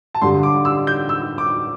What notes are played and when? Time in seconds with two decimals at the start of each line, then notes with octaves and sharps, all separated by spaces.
0.15 A5
0.21 G2 D3 G3 C6
0.43 D6
0.65 E6
0.87 G6
1.09 E6
1.38 D6